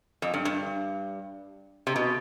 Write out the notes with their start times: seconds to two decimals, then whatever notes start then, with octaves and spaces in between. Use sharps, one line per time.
0.22 F2
0.34 G2
0.45 G2
1.87 C3
1.96 B2